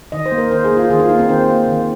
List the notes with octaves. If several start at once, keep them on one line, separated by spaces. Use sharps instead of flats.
D#3 D#5
C5
A#3
A#4
D#3 C5
G#4
A#3
F4
D#3 G#4
F4
A#3 D#4
C4
D#3 C5
A#3
D#3